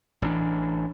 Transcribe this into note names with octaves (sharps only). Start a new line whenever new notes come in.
A1 E3 G#3 D4